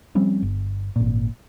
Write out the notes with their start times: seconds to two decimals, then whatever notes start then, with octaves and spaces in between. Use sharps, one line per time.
0.15 F3 G3 C4 C#4
0.42 G1
0.96 G#1 A#2